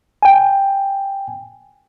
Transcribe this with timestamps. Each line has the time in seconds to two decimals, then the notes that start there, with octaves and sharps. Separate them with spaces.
0.22 G5 G#5